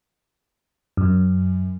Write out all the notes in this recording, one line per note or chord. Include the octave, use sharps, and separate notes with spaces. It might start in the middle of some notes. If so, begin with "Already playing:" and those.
F#2